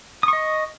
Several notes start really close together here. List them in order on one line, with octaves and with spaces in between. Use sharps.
D#6 C#6 D#5